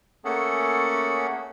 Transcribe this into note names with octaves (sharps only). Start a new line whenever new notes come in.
A3 A#3 C#4 G#4 A4 F#5